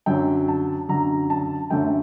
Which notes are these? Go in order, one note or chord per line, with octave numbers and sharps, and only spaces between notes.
F#2 D3 F#3 G5
A5
F#2 D3 F#3 A#5
A5
F#2 D3 A3 G5